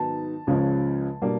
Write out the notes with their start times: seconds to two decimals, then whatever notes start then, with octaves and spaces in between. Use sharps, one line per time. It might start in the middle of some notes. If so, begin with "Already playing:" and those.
Already playing: G#2 D#3 F#3 B3 D#4 A5
0.47 C#2 C#3 F3 G#3 C#4
1.22 B2 G3 A#3 D4